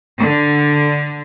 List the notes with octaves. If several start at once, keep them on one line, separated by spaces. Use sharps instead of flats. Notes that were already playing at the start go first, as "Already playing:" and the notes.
D3